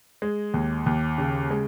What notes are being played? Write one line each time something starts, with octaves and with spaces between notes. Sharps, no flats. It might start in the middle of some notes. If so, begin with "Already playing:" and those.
G#3
D#2
D#2
C#3
G#3